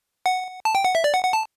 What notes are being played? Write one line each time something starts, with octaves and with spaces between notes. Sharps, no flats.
F#5
A5
G5
F#5
E5
D5
F#5
F#5
A5